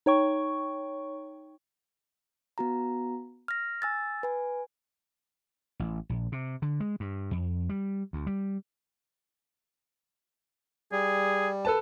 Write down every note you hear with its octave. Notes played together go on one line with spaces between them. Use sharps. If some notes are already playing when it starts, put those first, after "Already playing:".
D#4 C#5 G5 C#6
B3 F#4 A#5
F6 A#6
G#5 E6 A6
B4 G#5
A1
A#1
C3
D3
G#3
G2
F2
G3
D2
G3
G3 G#4
A4 B4 A5